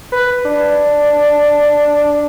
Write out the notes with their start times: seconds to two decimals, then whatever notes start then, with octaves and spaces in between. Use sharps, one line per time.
0.12 B4
0.45 D4